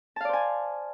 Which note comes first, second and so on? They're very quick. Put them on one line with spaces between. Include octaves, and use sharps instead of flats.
A5 F5 D5 C5 G#5